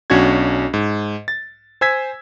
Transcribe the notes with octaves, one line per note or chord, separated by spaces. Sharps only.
B1 C#4 D4 F#4 G#6
G#2
A6
C5 G#5 E6 G#6 B6